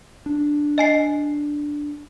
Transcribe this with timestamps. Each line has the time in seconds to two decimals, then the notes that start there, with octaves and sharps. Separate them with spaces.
0.26 D4
0.78 D#5 G#5 C7